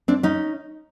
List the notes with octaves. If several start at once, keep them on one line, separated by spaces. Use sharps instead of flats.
C4 D4
C#4 D#4